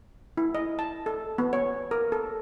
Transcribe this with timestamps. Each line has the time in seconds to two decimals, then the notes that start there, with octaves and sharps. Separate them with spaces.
0.37 E4
0.55 D#5
0.79 A5
1.06 A4
1.38 B3
1.53 C#5
1.91 A#4
2.12 A4